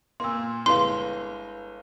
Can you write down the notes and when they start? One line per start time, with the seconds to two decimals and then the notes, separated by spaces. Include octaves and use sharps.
0.20 A#2 A#3 C6 E6
0.66 G1 G#3 E4 B4 F5 C6